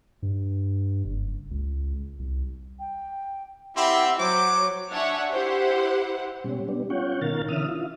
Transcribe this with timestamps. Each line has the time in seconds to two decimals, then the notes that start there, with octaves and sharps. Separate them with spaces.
0.23 G2
1.05 F#1
1.51 C#2
2.19 C2
2.79 G5
3.76 C4 E4 G4 E5 F#5 C6
4.19 F#3 C5 C#5 D6
4.92 D4 C#5 E5 F#5 G#5 C#6
5.31 E4 G4 C5 F#5
6.44 B2 G3 C#4
6.68 G3 B3 D4
6.90 C#4 F4 C#5 F#5 G5
7.21 B2 D#3 A#4 F5 A6
7.48 D3 E3 C#4 E5 D#6 F6
7.68 E4 F4